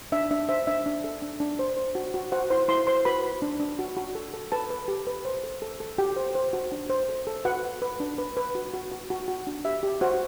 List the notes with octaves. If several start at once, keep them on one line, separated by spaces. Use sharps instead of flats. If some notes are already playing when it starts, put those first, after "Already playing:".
D4 E5
D4 E5
C5 E5
D4 E5
D4
A4
D4
D4
C5
C5
F#4
F#4
F#4 C5 F#5
E4 C5 C6
E4 C5 C6
C5 C6
F#4 B4 B5
F#4
D4
D4
F#4
F#4
A4
A4
A4 B4 A5
B4
G4
B4
C5
A4
A4
A4
F#4 G4 G5
C5
C5
F#4
D4
C5
A4
A4
F#4 B4 F#5
F#4
B4
D4
B4
B4
F#4
F#4
F#4
F#4
F#4
D4
G4 E5
G4
F#4 C5 F#5